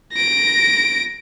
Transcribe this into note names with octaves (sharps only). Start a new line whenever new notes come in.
A#6 D7